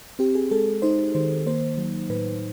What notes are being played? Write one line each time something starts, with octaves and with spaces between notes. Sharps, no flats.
C4 G4
G#4
G#3 A4
D#4 C5
D#3 C5
A#3 C5
F#3
A2 B4